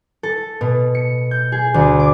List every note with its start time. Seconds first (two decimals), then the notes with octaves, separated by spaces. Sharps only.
0.23 A4
0.61 B2
0.95 C#7
1.31 G6
1.52 G#4
1.74 D2
2.00 D6